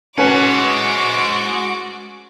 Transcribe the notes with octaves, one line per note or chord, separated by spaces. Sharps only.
G#3 C#4 F#4 B4 F#5 G#5 D6